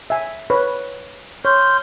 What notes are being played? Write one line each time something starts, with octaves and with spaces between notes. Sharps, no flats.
E5 G#5
B4 C#5
C#5 C6 F6 G6